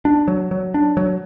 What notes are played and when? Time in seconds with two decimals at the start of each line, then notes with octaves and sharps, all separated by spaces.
0.05 D4
0.28 F#3
0.51 F#3
0.74 D4
0.97 F#3